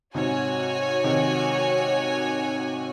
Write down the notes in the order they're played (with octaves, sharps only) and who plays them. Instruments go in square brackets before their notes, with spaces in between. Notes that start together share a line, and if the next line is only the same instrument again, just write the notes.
[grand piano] G#2 C3 [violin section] F#4 C#5 G#5
[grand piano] C3 D#3